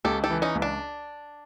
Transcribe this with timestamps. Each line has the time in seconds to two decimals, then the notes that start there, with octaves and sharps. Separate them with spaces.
0.05 C#2 G4 A4
0.24 G4 A4
0.30 E3
0.42 C#4 D#4
0.55 C#2
0.62 D4